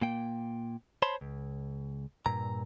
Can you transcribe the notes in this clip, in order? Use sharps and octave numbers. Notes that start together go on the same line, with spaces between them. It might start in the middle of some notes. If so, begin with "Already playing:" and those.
A#2 A#3 G5
C5 C#5 A5 B5 C6
C#2
G2 A#2 A#5